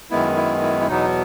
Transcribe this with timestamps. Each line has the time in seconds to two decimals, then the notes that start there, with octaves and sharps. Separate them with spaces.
0.11 F#2 D#3 G#3 B3 E4
0.36 E4
0.62 E4
0.80 E4
0.88 E2 B2 F#3 B3 D#4